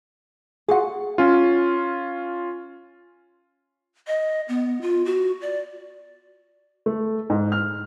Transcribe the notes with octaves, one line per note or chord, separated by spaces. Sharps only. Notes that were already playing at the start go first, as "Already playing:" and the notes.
F4 F#4 G#4 F#5
C#4 F4
D#5
B3
F4
F#4
D5
A3
G#2
F6